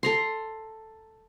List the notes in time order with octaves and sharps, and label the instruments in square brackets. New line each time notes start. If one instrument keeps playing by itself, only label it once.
[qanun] A4 A#5 C6